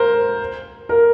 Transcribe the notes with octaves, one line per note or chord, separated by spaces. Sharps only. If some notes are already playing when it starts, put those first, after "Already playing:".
Already playing: A#4 C5
A#4